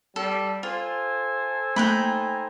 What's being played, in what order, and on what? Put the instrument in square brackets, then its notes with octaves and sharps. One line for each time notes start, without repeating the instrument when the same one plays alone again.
[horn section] G3 [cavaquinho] A4
[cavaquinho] F4 [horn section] A4 C5 G#5
[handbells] A3 A#3 F#6 [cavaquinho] D#4 G5 B5